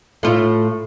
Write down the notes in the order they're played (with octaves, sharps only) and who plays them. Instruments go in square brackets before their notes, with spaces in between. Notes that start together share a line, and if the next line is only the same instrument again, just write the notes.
[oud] A2 F4